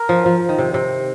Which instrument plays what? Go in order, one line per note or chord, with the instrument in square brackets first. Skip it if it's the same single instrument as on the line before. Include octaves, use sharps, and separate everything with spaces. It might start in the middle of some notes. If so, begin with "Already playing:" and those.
Already playing: [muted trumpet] A#4
[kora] F3
F3
D#3
C3
C3